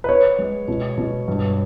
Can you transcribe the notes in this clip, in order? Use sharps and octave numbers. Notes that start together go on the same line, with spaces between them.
B4
B3 C#5
G#3
B2
B2
G2